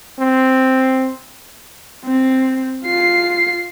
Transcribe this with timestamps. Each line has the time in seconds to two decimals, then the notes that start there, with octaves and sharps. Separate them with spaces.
0.19 C4
2.05 C4
2.85 F4 C7